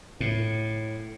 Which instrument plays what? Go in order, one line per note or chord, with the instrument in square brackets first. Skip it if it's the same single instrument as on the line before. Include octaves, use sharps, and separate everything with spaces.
[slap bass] A2